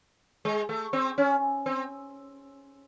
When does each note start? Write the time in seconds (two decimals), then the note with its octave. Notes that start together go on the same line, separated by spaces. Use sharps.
0.45 G#3
0.69 A3
0.93 C4
1.18 C#4
1.66 C4